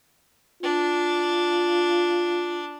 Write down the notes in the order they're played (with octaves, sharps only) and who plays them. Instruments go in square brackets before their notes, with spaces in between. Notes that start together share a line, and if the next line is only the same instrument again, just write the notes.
[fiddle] D4 [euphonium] F4